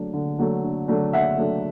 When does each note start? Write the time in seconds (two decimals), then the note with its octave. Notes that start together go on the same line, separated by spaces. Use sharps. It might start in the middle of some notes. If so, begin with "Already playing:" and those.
Already playing: F#3 A3 D4
0.14 D3
0.39 F#3 A3 D4
0.64 D3
0.88 F#3 A3 D4
1.13 D3 E5 F#5
1.38 F#3 A3 D4